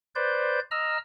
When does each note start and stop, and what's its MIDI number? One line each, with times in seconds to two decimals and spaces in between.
0.15 0.60 71
0.15 0.60 72
0.15 0.60 74
0.15 0.60 91
0.71 0.98 75
0.71 0.98 82
0.71 0.98 88
0.71 0.98 89